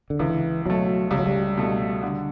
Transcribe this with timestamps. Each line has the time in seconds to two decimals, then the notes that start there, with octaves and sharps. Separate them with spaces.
0.10 D3
0.19 C#2 E3
0.65 B2 F#3 A3
1.11 C#2 G3
1.19 F#3
1.27 G3
1.57 B2 A3
2.03 D3